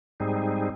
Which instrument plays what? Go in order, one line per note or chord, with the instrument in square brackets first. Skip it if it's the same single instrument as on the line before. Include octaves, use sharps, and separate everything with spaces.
[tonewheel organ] G#2 G3 C4 D#4 G#4